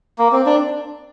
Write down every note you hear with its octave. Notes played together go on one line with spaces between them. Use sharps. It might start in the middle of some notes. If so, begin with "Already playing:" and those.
A#3
C4
D4